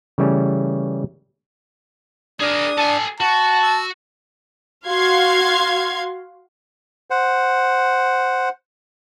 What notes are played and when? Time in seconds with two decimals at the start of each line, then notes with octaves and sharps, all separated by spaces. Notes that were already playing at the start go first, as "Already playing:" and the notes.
0.18 C#3 E3 G3 A3 C#4
2.41 D4 G#4 A#4 D#6
2.78 A4 G#5 A5
3.20 F#4 F#5 A5
3.63 E6
4.86 F#4 F5 C6 G#6
7.10 C5 F#5